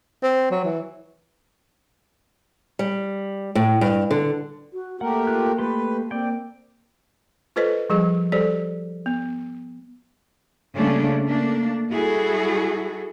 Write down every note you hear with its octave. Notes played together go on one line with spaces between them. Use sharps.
C4
F#3
E3
G3
A2
G2
D3
F#4
A3 A#3 G4 A#4 F#5
F4 F#6
A3 G4 B4 C6
A#3 C4 D5 G5
F4 A4 B4 C5 D#5
F3 G3 G#4 D#5
G3 G4 A4 C5 D5
B3
C#3 G3 A3 A#3 C#4 D4
A3 A#3 D4
G3 E4 F#4 G#4 A4